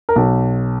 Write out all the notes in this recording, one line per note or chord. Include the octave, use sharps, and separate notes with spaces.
A#4
B1